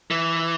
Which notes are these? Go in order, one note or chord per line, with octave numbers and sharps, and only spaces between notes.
E3